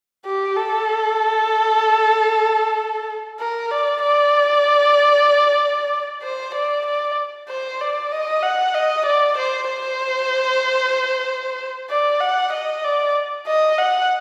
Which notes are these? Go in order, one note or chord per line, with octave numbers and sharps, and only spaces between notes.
G4
A4
A#4
D5
D5
C5
D5
D5
C5
D5
D#5
F#5
D#5
D5
C5
C5
D5
F#5
D#5
D5
D#5
F#5